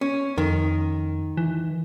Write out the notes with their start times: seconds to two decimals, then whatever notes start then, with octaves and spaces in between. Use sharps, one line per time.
0.01 C#4
0.38 F2 D#3
1.37 E3